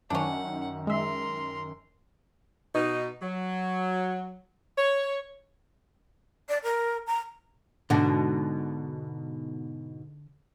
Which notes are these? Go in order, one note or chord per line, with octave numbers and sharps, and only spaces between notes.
F#2 D#3 C#4 D4 F#5
G#3 A#4 E5 C6
B2 D#4
F#3
C#5
D5
A#4
A#5
G#2 B2 D3 F#4